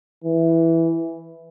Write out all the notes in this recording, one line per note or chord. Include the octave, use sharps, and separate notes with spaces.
E3